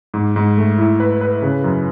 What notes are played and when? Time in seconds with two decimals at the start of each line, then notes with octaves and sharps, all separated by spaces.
0.14 G#2
0.36 G#2
0.57 A3
0.78 E4
1.00 B4
1.21 B4
1.42 C#3
1.64 F#2